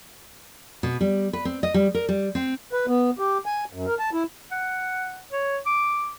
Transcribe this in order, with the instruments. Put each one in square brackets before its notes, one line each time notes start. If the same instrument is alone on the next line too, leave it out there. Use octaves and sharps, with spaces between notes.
[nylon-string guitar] B2
G3
B4
C4
D#5
G3
A#4
G3
C4
[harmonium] B4
B3
G4
G#5
F#2
A#4
A5
E4
[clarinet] F#5
C#5
D6